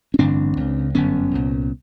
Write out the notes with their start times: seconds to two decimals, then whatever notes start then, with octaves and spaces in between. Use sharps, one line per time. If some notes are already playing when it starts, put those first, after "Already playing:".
0.14 C#4
0.19 A1 G2 D3 C4 D4
0.57 C#2 C#3
0.95 G1 F#2 D3 B3 C#4
1.33 C2 A#2